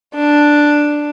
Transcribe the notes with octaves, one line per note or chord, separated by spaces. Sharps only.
D4